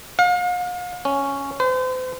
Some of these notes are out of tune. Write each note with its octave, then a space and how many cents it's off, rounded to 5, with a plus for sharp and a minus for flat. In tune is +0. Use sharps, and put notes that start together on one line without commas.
F5 +40
C#4 +0
C5 -40